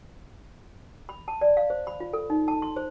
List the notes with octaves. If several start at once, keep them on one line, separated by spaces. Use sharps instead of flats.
B5
A5
D5
F5
C5
B5
F4
A4
D#4
A5
C6
C5